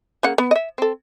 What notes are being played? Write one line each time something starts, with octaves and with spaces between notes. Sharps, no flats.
C#3 A#3 F#5
B3
D#5 E5
C4 A4